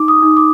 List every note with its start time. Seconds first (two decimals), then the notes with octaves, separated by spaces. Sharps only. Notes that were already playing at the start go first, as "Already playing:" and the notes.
Already playing: D#4 D6
0.08 D#6
0.23 D#4
0.37 D6